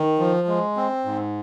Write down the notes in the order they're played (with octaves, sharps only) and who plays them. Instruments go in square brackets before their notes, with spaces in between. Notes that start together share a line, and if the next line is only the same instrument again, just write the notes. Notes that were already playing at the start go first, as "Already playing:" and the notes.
Already playing: [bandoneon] D#3
F3
G#3
C4
G#2